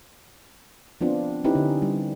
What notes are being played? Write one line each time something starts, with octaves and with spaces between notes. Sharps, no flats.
F3 B3 C4 D4 F4
C4 C#4 D#4 E4 G4 B4
D3
G3